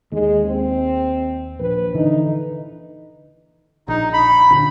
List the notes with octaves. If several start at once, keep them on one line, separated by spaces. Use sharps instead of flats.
D#2 G#3
C4
A#1 B4
D3 E3 D#4
A#1 D#4
B5
A#1 D3